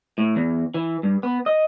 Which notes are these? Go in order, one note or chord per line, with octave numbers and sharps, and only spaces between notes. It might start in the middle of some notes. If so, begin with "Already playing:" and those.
A2
E2
E3
G2
B3
D#5